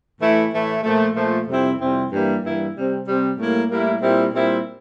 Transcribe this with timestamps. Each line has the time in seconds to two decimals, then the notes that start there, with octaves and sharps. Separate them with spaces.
0.20 A2 E3 A3 E4
0.52 A2 E3 A3 E4
0.84 A#2 F3 A3
1.16 A#2 F3 A3
1.47 F2 C3 G3 C4 E4
1.79 F2 C3 G3 C4 E4
2.11 G2 E3 G3 A#3 E4
2.43 G2 E3 G3 A#3 E4
2.75 C3 G3 C4
3.06 C3 G3 C4
3.38 A2 G3 A#3 E4
3.70 A2 G3 A#3 E4
4.02 A#2 G3 C4 E4
4.34 A#2 G3 C4 E4